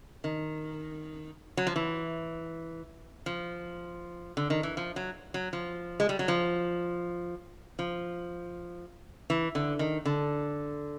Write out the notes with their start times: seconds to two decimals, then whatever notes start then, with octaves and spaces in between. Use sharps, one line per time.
0.24 D#3
1.57 F#3
1.67 F3
1.76 E3
3.26 F3
4.37 D3
4.50 D#3
4.63 E3
4.77 F3
4.96 F#3
5.34 F#3
5.53 F3
6.00 G#3
6.09 G3
6.19 F#3
6.28 F3
7.79 F3
9.30 E3
9.55 D3
9.79 D#3
10.05 D3